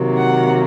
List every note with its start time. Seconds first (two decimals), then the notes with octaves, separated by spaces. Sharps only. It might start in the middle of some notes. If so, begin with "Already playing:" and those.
Already playing: C3 D#3 F#3 A#3
0.17 F#5